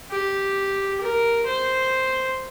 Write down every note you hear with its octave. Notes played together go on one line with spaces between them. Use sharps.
G4
A#4
C5